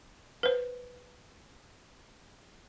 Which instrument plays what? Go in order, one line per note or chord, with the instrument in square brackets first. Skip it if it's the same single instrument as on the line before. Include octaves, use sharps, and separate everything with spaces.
[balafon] B4 C5